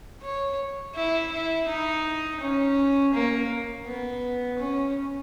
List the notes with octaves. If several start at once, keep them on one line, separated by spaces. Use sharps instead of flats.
C#5
E4
E4
D#4
C#4
A#3
B3
C#4